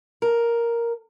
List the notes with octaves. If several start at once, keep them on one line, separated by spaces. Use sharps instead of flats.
A#4